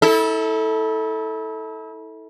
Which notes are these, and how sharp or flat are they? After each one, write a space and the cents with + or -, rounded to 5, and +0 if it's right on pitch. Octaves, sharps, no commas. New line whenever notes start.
E4 -35 A4 +0